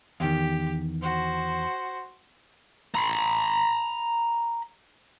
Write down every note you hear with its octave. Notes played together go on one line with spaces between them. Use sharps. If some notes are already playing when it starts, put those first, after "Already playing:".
E2 D#3 G4
F#4 C5
A#5 B5